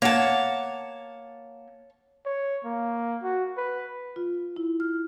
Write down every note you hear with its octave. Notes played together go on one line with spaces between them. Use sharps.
A#3 C#5 F#5 A5
C#5
A#3
F#4
B4
F4
E4
F6